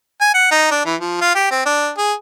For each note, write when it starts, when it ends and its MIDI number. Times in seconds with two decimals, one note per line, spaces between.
0.21 0.32 80
0.34 0.48 78
0.51 0.67 63
0.71 0.82 62
0.86 0.95 52
1.01 1.20 53
1.21 1.34 65
1.35 1.47 67
1.51 1.63 60
1.66 1.90 62
1.98 2.13 68